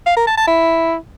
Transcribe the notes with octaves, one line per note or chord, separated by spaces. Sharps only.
F5
A#4
A5
A5
E4